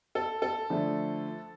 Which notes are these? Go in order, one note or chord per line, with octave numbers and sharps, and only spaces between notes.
A4
A4
D3 F3 A3